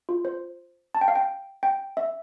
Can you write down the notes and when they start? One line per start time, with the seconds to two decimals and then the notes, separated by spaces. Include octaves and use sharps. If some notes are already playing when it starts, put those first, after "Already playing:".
0.09 F4
0.25 C5
0.95 A5
1.01 G5
1.08 F5
1.15 G5
1.63 G5
1.97 E5